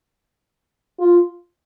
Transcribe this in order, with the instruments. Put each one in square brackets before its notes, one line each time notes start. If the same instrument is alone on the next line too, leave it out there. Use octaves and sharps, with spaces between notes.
[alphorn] F4